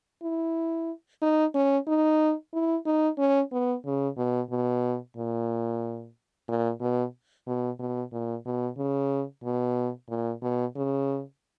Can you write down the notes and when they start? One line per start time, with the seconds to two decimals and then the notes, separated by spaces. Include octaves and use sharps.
0.22 E4
1.22 D#4
1.55 C#4
1.87 D#4
2.54 E4
2.86 D#4
3.18 C#4
3.52 B3
3.85 C#3
4.18 B2
4.50 B2
5.17 A#2
6.48 A#2
6.81 B2
7.47 B2
7.79 B2
8.12 A#2
8.46 B2
8.78 C#3
9.44 B2
10.09 A#2
10.42 B2
10.76 C#3